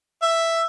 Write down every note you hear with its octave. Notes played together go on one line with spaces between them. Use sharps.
E5